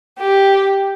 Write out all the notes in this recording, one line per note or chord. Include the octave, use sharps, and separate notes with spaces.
G4